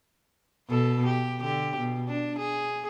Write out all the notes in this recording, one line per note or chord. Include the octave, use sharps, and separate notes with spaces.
B2 A4
G4
D3 G4
B2
D4
G#4